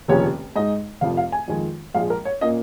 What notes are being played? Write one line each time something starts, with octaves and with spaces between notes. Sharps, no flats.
F1 D#2 C#3 F3 C#4 C#5
G#2 G#3 D#4 D#5
F1 F2 F3 F5
F5
G#5
F2 D#3 G#3 F4
A#1 G#2 F3 G#3 F5
A#4
C#5
A#2 A#3 C#4 F4 D#5